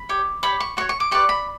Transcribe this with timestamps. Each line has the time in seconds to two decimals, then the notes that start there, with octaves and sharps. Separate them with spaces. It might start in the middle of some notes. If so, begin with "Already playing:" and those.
Already playing: B5
0.09 G4 C#5
0.43 G4 C#5 B5
0.60 C#6
0.77 F#4 C#6
0.81 C#5
0.89 C#6
1.00 D6
1.11 G4 B4 D5 C#6
1.29 B5